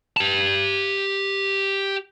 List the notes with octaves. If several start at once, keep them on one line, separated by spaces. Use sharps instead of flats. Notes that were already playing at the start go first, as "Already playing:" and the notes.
G4 A5